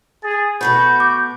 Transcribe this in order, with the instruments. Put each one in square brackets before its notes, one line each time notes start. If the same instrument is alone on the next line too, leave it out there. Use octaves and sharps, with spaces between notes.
[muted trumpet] G#4 [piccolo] A6
[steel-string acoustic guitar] B2 A3 B4 [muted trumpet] F#4 [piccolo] G6
[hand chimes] D6